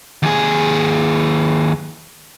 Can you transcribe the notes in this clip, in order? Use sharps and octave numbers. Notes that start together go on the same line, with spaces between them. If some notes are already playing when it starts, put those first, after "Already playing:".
D#2 G#4